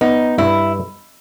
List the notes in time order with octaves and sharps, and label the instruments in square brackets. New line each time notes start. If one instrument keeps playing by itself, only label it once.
[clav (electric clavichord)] B3 [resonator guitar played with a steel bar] D#4
[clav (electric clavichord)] G2 [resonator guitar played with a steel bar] E4